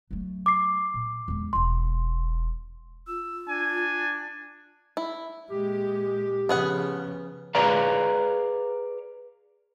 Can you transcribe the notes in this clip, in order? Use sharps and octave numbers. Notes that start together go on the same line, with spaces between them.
F#3 A3
D6 C7
A#2
E2 G#3
E1 F4 C6
F4 E6
D4 G#5
E4
A#2 G#3 G4
C#3 F3 B3 G#4 F#5
G#4 B4 C#5 D5 F5 A#5